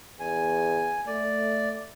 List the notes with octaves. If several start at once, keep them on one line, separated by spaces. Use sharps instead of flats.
E2 G#5
A3 D5